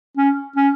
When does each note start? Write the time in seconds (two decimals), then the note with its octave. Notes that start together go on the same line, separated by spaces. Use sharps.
0.17 C#4
0.56 C#4